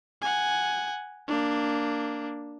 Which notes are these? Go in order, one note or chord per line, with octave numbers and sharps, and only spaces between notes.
F#5 G#5
A#3 D4